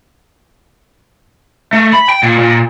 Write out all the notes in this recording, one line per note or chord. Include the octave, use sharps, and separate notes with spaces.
A3
B5
G5
A#2
A#2